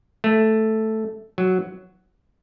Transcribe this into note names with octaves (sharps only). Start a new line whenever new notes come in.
A3
F#3